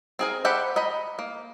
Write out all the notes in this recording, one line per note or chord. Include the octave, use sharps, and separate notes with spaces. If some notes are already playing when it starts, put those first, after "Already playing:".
C4 G#4 A#4
G4 A4 C5 F#5 B5
D#5 A#5 B5
A#3